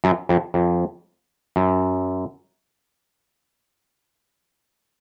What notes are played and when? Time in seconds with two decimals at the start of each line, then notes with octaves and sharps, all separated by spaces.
0.04 F#2
0.29 F2
0.54 F2
1.56 F#2